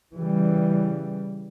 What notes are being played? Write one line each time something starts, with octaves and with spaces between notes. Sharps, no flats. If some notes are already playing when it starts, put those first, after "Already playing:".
C#3 E3 G3